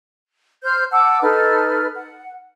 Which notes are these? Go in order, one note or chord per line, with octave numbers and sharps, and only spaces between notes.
C5 F6 G6
F#5 A5 D6 E6
D#4 A4 B4 F6
F#5